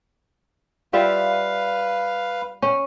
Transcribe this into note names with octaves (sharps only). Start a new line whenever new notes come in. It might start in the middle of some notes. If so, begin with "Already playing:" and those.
G3 F4 B4 E5 F5
C#4